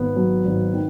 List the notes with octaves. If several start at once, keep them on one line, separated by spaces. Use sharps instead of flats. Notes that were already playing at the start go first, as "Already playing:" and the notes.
Already playing: G#1 B3
F#3
G#1
D#3